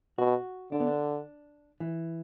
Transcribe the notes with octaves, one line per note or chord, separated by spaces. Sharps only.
B2 F#4
D3 D4
B3
D4
E3